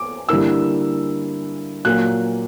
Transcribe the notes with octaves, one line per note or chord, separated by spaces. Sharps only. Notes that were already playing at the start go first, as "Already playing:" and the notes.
Already playing: D6
D3 G3 A#3 E4 E6
A#2 F#3 A#3 F#6